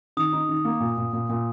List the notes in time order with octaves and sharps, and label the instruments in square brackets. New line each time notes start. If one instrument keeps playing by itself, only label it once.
[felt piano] D#3 [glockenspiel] D#6
[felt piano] D#4
D#3
A#3
A#2
A#2
A#2
A#2